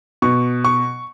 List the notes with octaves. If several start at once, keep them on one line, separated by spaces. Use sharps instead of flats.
B2 C#6
C#6